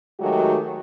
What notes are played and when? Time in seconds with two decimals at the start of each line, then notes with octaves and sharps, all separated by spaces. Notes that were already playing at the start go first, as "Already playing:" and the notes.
0.20 D#3 F#3 G#3 A3 F#4 G4